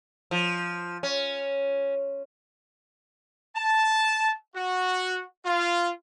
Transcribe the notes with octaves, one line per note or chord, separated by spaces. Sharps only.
F3
C#4
A5
F#4
F4